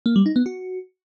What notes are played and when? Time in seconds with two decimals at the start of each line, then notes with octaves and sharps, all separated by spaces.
0.06 A#3
0.16 G3
0.26 D#4
0.36 B3
0.46 F#4